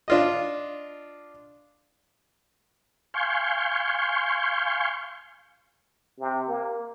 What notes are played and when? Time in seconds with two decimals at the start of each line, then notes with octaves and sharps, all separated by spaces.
0.08 D4 F4 D#5
3.14 F5 G#5 C6 C#6 G6
6.19 C3
6.48 A#3